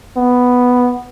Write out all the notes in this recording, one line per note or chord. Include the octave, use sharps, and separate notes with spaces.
B3